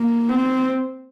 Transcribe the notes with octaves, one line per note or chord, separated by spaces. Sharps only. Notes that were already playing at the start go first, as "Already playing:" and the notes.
Already playing: A#3
C4